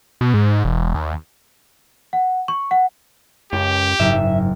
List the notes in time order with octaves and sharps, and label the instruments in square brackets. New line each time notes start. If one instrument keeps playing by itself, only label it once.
[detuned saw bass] B2
G#2
E1
D#2
[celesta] F#5
C#6
F#5
[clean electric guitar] C#2 [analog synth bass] F#2 [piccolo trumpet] G4
[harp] F#1 [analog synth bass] G#2 [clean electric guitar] E5